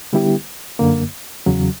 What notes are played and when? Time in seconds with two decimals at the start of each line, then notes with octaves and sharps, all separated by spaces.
0.13 D3 G3 B3 E4 G4
0.79 F#2 D3 A#3
1.46 E2 C#3 F#3